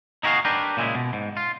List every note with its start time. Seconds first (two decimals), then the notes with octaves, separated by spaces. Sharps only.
0.23 D#4 E4 F#4 G#4 F5
0.45 D4 G4 A#4 B4
0.77 A#2 C#3 G#3 E4
0.95 B2
1.13 G#2
1.37 F4